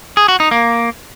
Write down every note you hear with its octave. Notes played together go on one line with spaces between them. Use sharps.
G#4
F#4
D#4
A#3